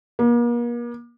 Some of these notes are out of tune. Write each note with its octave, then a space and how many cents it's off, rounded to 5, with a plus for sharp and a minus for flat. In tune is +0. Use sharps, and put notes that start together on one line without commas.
A#3 +40